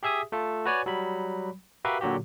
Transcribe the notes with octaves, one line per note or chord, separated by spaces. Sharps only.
G4 G#4 E5 G#5 D#6
A3 F4 A4
F#4 B4 C#5 D5 G#5
F#3 G3 B5
F#4 G4 A#4 B4 E5 F5
A#2 D3 F#3 F#4 G4